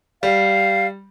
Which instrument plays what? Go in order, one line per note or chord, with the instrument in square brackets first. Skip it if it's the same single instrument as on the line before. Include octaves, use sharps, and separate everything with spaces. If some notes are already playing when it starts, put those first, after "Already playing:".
[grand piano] G3 [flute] F5